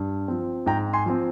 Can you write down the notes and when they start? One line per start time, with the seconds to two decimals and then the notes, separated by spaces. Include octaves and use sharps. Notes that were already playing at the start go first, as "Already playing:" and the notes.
Already playing: G2
0.28 F3 C4
0.66 G#2 G5 A#5
0.93 G#5 C6
1.06 F3 C4